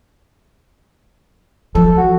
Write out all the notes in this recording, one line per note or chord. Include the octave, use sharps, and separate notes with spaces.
F3 A4
F#4